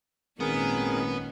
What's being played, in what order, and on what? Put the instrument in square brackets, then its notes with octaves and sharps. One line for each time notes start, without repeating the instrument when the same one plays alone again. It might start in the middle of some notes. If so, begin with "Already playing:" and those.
[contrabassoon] G#1 [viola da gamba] A#2 D#3 C#4 [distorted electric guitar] B3 [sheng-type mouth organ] G#4 A#4